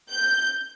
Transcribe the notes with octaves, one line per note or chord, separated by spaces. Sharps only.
G6